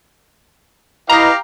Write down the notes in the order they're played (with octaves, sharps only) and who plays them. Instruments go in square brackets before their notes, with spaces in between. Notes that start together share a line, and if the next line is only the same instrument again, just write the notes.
[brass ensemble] E4 B4 D#5 [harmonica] G4 F5 [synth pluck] A#5 A#6